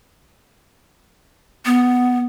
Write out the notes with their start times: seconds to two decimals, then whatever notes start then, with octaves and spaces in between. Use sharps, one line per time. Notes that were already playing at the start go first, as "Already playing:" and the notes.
1.65 B3